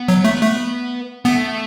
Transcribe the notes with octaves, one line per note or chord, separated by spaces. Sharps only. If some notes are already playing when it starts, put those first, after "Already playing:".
Already playing: B3
F#3
A3
A3
A3 B3